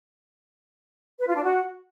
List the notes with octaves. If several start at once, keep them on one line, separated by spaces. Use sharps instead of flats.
B4
F4
D4
F#4